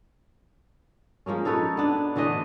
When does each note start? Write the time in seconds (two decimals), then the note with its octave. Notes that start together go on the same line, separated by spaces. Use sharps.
1.26 F3 G#3 A#3 C#4
1.45 D#4 A4 B4 C#5
1.77 B3 D4
2.16 D3 E3 A3 D#5